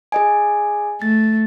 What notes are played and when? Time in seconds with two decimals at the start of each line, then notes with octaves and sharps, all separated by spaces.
0.12 G#4 D#5 G#5
1.02 A3 A6